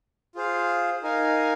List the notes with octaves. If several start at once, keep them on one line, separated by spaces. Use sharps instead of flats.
F4 G#4 C5 F5
D#4 A#4 F5 G#5